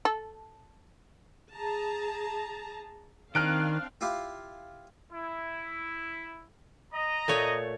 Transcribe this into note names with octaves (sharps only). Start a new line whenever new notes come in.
A4
G#4 A5 A#5
D#3 C4 D4 F5 F6 F#6 D7
E4 F4 G4
E4
D#5 A#5
A#2 A3 C#5